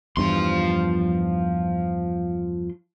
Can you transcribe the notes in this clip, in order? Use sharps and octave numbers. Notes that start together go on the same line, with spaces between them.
E2 G2 E3 F3 C6